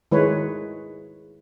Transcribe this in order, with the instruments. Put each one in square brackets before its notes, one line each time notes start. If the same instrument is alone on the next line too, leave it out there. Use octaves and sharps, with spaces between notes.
[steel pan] D#3 G#3 E4 B4 C#5